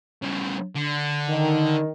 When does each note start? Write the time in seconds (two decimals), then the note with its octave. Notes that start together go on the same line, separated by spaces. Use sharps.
0.22 C#3 G3
0.76 D3
1.28 D#3